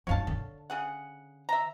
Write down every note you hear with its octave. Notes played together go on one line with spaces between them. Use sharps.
F#2 D#4 C#5 F5 A5
D3
C#3 G#4 F#5
E5 A#5